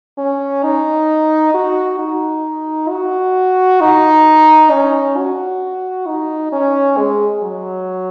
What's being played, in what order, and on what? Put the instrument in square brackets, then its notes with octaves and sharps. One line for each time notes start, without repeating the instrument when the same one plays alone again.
[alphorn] C#4
D#4
F#4
D#4
F#4
D#4
C#4
F#4
D#4
C#4
G#3
F#3